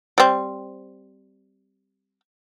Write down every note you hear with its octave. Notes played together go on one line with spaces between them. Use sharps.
G3 C4